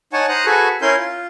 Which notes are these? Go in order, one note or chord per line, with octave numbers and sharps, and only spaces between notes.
D#4 C#5 F#5 G#5 A5 C#6
C5 A#5 D#6 F#6
F#4 G#4 A4 B4 G#5 C#6
C#4 E4 A#4 G#5 C6 G6
F4